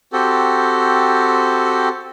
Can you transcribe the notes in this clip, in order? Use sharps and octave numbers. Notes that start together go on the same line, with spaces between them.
C4 F#4 G4 A4